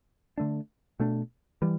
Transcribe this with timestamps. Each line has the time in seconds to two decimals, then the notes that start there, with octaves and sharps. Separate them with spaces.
0.38 D3 A3 D4
1.00 B2 A3 D4
1.62 E3 G3